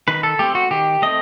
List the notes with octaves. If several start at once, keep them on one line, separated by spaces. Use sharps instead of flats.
D#3 B4
A4
A3 C4 G4
F#4
D#3 G4
A3 C4 D#5